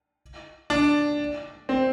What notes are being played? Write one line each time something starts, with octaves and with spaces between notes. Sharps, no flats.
D4
C4